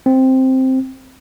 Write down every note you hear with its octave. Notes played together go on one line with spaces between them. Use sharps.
C4